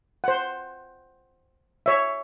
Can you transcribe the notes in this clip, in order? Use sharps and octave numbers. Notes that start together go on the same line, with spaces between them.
C5 F#5
C#5 E5